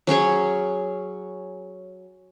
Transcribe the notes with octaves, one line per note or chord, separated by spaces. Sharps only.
F#3 C#4 G#4 C#5